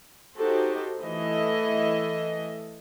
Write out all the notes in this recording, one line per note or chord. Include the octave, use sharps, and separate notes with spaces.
D#4 F#4 G4 A4 C5
E3 A3 A4 D#5 E5